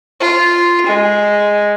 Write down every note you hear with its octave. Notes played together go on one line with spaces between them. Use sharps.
F4
G#3